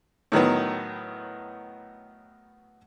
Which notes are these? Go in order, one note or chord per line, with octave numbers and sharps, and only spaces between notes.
A2 D#3 F#3 B3